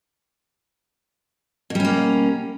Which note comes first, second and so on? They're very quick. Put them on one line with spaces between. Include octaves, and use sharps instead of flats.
B2 G3 C#4 A#3